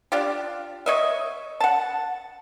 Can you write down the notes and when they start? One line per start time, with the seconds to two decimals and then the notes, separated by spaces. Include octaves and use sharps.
0.12 D4 F4 G4
0.86 C#5 D#5 E5
1.60 F#5 A5